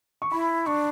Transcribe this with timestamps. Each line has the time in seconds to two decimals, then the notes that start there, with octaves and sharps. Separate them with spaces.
0.22 C#6
0.32 E4 B5
0.66 D4 C#6